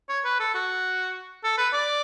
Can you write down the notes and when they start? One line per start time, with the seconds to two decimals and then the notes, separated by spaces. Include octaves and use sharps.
0.09 C#5
0.25 B4
0.39 A4
0.54 F#4
1.44 A4
1.58 B4
1.73 D5